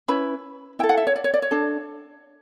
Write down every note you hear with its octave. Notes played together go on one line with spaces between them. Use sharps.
C#4 E4 B4 B5
E4 A4 G5
F#5
E5
C#5
D5
C#5
D5
C#5
D4 A4